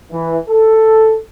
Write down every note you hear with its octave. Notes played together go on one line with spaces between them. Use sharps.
E3
A4